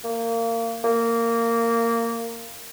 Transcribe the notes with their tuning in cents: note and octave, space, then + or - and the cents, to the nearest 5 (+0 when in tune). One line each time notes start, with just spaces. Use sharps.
A#3 -25
A#3 -15